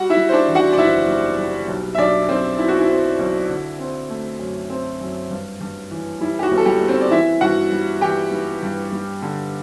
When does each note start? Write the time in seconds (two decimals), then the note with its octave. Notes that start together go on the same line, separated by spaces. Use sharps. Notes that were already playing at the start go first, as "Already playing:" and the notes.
Already playing: G3 F#4 F#5
0.10 E4 E5
0.17 G3
0.29 C5
0.32 D4 D5
0.48 E2
0.55 F#4 F#5
0.73 D5
0.77 F#1 E4 E5
1.08 G3
1.38 G3
1.68 B1
1.95 E5
1.98 B1 D4 D5
2.29 B1 C4 C5
2.58 B2 E4
2.68 F#4
2.79 E4
2.90 C4
3.19 B1
3.49 D3
3.79 C4
4.10 A3
4.39 F#2
4.70 C4
5.01 F#2
5.31 G2
5.61 G2
5.91 E3
6.21 G3 E4
6.39 G4
6.43 F#4
6.52 G1
6.57 A4
6.66 G3 G4
6.81 G1
6.88 C4 C5
7.01 D5
7.11 E3 E4 E5
7.41 G2 F#4 F#5
7.72 G3
8.01 E3 G4 G5
8.31 G3
8.63 G2
8.93 G3
9.22 D3